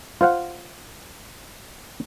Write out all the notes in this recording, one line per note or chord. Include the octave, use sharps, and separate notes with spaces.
F4 C5 F5 F#5